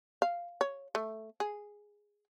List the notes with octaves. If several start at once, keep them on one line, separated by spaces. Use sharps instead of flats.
F5
C#5
A3
G#4